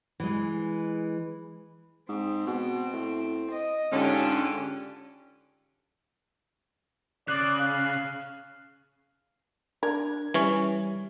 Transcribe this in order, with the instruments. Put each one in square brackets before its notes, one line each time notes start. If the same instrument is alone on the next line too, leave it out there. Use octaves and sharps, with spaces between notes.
[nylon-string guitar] E3 G#3
[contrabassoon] G#2 [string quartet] C4
[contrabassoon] B2
A2
[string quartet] D#5
[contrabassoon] G#2 [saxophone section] D3 C#4 [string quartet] D4 F4 G4
[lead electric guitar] C#3 [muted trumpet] D5 [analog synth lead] F#6
[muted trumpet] F5
[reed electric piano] D4 G#6 [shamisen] A#4
[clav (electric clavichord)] E3 C#4 C#5 [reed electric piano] G3